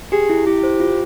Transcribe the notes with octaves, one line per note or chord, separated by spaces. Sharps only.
G4 G#4
E4
E4 G4
C5
F4